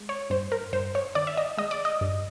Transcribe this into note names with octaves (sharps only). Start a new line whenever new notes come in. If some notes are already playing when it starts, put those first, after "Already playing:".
Already playing: G#3
C#5
G2 C5
A#4
G2 C5
C#5
D#3 D5
E5
D#5
G#3 D#5
D5
D#5
G2